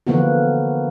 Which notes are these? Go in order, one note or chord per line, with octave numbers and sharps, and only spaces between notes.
D3 E3 F3 A#3 B3 F#4